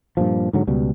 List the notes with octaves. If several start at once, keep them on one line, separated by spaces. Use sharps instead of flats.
G2 A#2 F3
G#2 D3 F#3
C#2 B2 G3